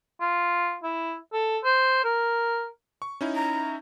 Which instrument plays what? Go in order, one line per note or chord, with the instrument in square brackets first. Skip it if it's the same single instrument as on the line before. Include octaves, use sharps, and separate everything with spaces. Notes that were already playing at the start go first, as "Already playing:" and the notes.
[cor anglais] F4
E4
A4
C5
A#4
[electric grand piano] C#6
C#4 D#4 E4
[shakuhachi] A#5